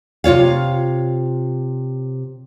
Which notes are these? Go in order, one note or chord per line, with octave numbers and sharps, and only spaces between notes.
C3 F4 C#5 F5